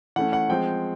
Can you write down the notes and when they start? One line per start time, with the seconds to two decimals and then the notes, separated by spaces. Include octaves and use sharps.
0.16 E3 A3 C#4 F#5
0.33 F#5
0.49 F3 G#3 C4 G5